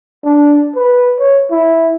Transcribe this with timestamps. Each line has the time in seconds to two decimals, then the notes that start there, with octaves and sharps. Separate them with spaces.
0.24 D4
0.75 B4
1.19 C#5
1.51 E4